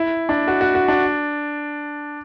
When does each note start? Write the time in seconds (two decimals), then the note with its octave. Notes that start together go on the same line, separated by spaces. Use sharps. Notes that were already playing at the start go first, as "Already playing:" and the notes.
Already playing: E4
0.29 D4
0.48 F#4
0.61 F#4
0.75 F#4
0.88 D4